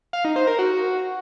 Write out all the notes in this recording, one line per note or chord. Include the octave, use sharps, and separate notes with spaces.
F5
D#4
C5
A#4
F#4